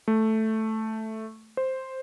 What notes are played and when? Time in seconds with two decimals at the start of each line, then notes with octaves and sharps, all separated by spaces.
0.08 A3
1.57 C5